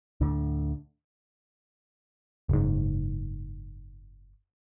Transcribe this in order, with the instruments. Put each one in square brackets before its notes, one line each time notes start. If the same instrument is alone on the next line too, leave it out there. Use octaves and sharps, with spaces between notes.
[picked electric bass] D2 A2 D3
F#1 G#2